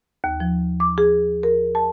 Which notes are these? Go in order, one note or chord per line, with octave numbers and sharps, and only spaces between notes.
D#2
F3
D6
G#4
A#4
A5